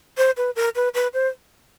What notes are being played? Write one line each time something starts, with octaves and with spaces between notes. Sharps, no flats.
C5
B4
A#4
B4
B4
C5